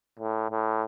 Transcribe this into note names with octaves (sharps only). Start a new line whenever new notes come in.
A2
A2